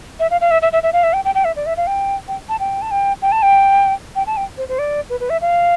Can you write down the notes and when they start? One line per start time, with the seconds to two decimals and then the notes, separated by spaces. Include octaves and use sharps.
0.20 E5
0.31 F5
0.41 F5
0.51 E5
0.62 E5
0.72 E5
0.83 E5
0.93 F5
1.03 E5
1.13 G5
1.25 G5
1.35 G5
1.45 E5
1.56 D5
1.66 E5
1.77 F5
1.87 G5
2.28 G5
2.49 A5
2.60 G5
2.82 A5
2.91 G5
3.22 G5
3.32 A5
3.42 G5
4.16 G5
4.27 A5
4.37 G5
4.58 C5
4.69 C5
4.79 D5
5.10 B4
5.20 B4
5.30 E5
5.41 F5